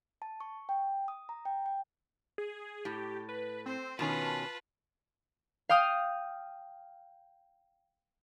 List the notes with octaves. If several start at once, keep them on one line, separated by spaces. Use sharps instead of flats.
A5
C#6
G5
D#6
A#5
G5
G5
G#4
A2 G4
B4
C4 C5
B2 D#3 C#4 F4 B4 A5
F5 G5 D#6 F6